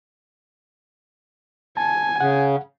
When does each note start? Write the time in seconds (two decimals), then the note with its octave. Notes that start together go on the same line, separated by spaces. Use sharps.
1.77 G#5 A5
2.20 C#3 F#5